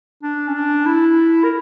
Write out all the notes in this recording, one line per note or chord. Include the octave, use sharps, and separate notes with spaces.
D4
C#4
D4
E4
A#4